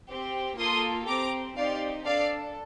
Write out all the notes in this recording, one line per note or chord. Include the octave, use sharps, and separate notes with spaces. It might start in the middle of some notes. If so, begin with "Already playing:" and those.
C4 G4
A#3 F4 A4 C6 D#6
C4 G4 A#5 D6
C4 D#4 G4 D5 F5
D4 A4 D5 F5